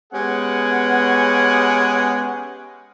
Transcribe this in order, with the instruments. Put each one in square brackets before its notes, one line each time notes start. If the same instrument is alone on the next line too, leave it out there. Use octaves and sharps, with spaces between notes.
[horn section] G#3 B3 C#4 G4 G#4 F#5